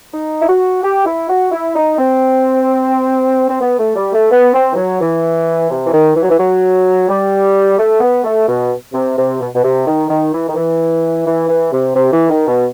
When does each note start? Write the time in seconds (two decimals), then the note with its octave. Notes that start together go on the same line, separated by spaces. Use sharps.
0.12 D#4
0.41 E4
0.47 F#4
0.82 G4
1.05 E4
1.28 F#4
1.52 E4
1.74 D#4
1.98 C4
3.49 C4
3.60 B3
3.78 A3
3.95 G3
4.12 A3
4.30 B3
4.53 C4
4.71 E3
4.76 F#3
4.99 E3
5.69 C3
5.86 E3
5.92 D#3
6.15 E3
6.22 F#3
6.29 E3
6.38 F#3
7.08 G3
7.77 A3
8.00 B3
8.24 A3
8.46 B2
8.93 C3
9.16 C3
9.39 B2
9.53 B2
9.62 C3
9.86 D#3
10.08 D#3
10.32 E3
10.48 D#3
10.55 E3
11.25 E3
11.48 E3
11.71 C3
11.94 C3
12.12 E3
12.29 D#3
12.47 B2